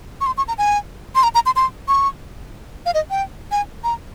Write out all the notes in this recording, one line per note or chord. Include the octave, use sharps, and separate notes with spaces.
C#6
C6
C#6
A#5
G#5
C6
A#5
A#5
C6
C6
C#6
F5
D#5
G5
G#5
A#5